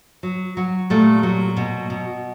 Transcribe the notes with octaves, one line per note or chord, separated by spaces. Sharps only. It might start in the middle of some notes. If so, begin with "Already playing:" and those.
F#3
F#3
A#2 G3 A3
F#3
B2
B2